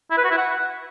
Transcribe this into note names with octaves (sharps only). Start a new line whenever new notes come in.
E4
B4
F#4
E4
F#5